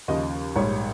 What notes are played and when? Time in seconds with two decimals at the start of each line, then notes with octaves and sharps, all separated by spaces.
0.08 D#2 C#3 F3 D#5
0.56 A#1 G#2 G3 C#5